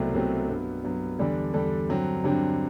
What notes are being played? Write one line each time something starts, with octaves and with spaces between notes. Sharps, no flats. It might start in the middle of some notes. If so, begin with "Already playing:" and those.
Already playing: C2 B2 F#3 A3 C4
C2 B2 F#3 A3 C4
G2 F#3 B3
G2 F#3 B3
E2 D3 G3 D4 A4
E2 D3 G3 D4 A4
G2 D3 F#3 C4
G2 D3 F#3 C4